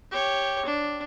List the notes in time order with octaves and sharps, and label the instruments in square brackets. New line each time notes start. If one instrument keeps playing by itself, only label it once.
[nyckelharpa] G4 C#5
D4